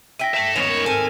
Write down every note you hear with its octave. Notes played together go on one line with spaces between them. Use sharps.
E4 G5 A#6 B6 D#7
G2 D5 E5 A5 E7
D#2 G#2 B3 C#4 A#4 C#5 D#5 F7
G#2 C4 A4 G#5 F6